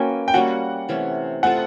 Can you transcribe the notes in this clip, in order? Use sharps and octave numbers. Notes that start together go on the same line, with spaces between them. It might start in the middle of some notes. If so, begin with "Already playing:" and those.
Already playing: A#3 C#4 F#4 B4 G5 G#5
G5
G3 A#3 C#4 F#4 F#5
C3 E3 A3 C#4
A3 C4 F4 A4 F#5